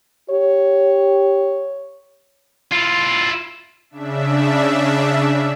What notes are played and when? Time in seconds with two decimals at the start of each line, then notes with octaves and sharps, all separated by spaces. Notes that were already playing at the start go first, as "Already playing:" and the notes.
0.30 G4 C#5
2.72 E4 F4
3.90 C#3 D4 E5